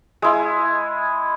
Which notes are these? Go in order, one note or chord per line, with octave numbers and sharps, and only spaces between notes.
G#3 E4